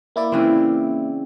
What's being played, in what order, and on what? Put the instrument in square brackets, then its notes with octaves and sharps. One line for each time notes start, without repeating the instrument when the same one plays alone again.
[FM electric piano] A#3 E4 D5
[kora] C#3 E3 C4